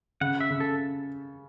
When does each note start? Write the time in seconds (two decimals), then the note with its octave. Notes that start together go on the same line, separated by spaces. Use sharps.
0.21 C#3 F#5
0.40 E5
0.50 C#3
0.60 A4